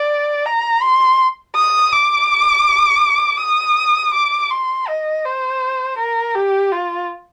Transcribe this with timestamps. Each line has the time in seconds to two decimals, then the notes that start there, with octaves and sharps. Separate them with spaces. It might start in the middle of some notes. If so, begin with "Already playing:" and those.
Already playing: D5
0.46 A#5
0.82 C6
1.56 D#6
1.92 D6
3.40 D#6
4.14 D6
4.51 C6
4.88 D#5
5.25 C5
5.98 A#4
6.35 G4
6.72 F4